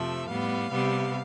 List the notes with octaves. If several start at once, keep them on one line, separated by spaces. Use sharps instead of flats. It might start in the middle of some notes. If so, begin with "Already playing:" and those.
Already playing: F2 C3 F3 A3 E5
A2 G3 B3 F5
C3 G3 B3